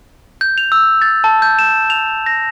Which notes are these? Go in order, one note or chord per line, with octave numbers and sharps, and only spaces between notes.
G6
F7
E6
A6
A5
G6
E7
F7
A#6